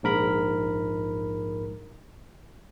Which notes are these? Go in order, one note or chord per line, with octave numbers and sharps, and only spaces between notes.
A#1 G#2 A#4 B5